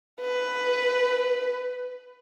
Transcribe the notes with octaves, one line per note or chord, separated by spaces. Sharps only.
B4